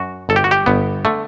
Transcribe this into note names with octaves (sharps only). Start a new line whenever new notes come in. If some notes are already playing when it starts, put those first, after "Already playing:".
Already playing: F#2 F#4
G1 A4
G4
F#4
G4
G1 B3
D3 A3